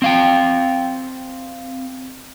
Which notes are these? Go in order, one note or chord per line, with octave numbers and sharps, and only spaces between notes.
C4 F5 G5